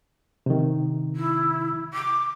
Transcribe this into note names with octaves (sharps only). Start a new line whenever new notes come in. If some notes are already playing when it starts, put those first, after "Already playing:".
C3 D#3
E4
D6